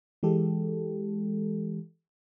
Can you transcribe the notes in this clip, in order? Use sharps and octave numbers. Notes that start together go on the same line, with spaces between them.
E3 G#3 G4 A4